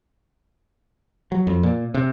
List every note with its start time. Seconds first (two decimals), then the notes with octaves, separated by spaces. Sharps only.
1.32 F#3
1.47 F2
1.63 A#2
1.94 C3